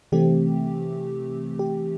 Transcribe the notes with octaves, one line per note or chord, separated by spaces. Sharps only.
C3 E3 A3 C4 G4
G4